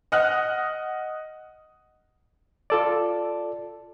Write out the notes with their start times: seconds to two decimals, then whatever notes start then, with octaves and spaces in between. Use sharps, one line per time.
0.12 D#5 F#5 F6 F#6
2.70 F4 A4 D5